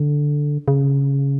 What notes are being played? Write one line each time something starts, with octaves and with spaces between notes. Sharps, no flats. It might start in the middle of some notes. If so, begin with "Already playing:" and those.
Already playing: D3
C#3